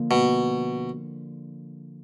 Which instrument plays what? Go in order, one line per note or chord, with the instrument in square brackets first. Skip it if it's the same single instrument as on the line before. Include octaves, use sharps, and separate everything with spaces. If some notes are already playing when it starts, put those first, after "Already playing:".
Already playing: [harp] D3 F3 A#3
[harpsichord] B2